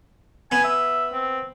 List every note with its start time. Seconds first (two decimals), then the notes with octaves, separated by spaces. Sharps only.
0.52 B3 G#5
0.64 E5
1.12 C4